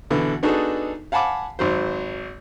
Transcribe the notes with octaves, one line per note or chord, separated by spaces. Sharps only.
B2 D3 E3
B3 D4 D#4 F#4 G#4 A4
F5 F#5 G#5 A5 B5 D6
G#1 F#3 C5